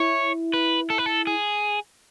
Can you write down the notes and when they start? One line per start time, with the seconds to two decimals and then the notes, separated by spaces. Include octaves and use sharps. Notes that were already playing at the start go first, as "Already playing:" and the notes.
Already playing: E4 C#5
0.54 B4
0.90 A4
0.98 B4
1.06 A4
1.27 G#4